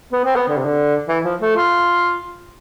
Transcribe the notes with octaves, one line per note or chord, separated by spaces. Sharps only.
B3
C4
B3
D3
C3
D3
E3
F3
A3
F4